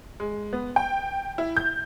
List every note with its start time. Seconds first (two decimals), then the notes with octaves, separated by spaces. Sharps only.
0.20 G#3
0.53 B3
0.76 G5
1.38 E4
1.57 G6